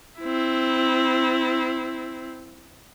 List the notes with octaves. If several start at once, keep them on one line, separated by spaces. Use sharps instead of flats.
C4 E4